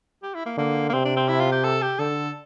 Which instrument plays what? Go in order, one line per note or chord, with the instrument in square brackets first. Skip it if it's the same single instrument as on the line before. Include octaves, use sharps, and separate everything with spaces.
[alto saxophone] G4
E4
A#3
[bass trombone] D3 [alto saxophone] A#3
[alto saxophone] A#3
[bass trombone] C3 [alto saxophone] C4
[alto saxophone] D4
C4
E4
F4
G4
A4
G4
[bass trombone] D3 [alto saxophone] A4